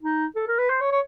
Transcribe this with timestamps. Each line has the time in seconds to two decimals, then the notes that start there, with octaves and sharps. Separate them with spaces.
0.03 D#4
0.36 A4
0.48 A#4
0.58 B4
0.70 C5
0.81 C#5
0.92 C#5